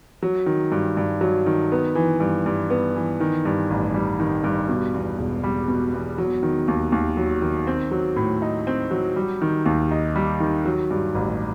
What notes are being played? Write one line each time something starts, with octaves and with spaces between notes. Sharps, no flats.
F#3
D#3
G2
G2
F#3
D#3
B3
E3
G2
G2
B3
E3
D#3
G2
A1
G3
D#3
G2
B2
E2
E1
G3
B2
E2
F#3
D#3
D#2
D#2
F#3
D#3
C4
F#3
A2
D#4
C4
F#3
G3
D#3
D#2
D#4
G3
D#3
F#3
G2
A1